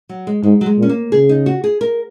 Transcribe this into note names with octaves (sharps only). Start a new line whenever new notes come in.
F#3
G#3
G#2 G#3
F#3
G#3
A#2
C#4
A#3
C#3 G#4
D#4
F#4
G#4
A#4